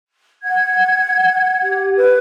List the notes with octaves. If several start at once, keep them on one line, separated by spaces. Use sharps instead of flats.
F#5 G#6
G4
B4